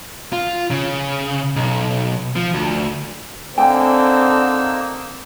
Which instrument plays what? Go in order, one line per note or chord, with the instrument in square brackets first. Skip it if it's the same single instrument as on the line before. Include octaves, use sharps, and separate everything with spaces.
[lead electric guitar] F4
C#3
B1
F3
D2
[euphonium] D3 [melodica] A#3 D#4 E6 [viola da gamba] C4 [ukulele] G5 G#5